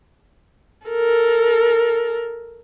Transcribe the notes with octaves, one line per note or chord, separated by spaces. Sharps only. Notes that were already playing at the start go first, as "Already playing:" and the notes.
A4 A#4